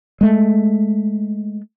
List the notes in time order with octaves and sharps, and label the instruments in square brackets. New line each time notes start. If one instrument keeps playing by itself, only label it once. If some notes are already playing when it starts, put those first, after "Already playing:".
[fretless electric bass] G#3 A3